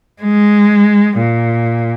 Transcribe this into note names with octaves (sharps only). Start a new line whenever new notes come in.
G#3
A#2